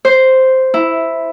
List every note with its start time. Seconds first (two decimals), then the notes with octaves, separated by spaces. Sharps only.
0.05 C5
0.74 E4